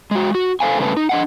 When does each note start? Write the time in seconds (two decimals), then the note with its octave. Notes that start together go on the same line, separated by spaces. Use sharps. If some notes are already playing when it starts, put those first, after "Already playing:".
0.11 G#3 F#4
0.35 F#4
0.60 A4 C5 F5 G#5
0.79 G2 C#3 A3 D4 B4 A5
0.97 D#4
1.09 D4 D#5 F#5